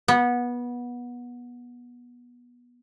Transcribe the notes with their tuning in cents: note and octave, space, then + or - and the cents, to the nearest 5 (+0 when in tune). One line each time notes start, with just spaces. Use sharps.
B3 -20